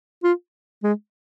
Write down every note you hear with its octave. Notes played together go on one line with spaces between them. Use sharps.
F4
G#3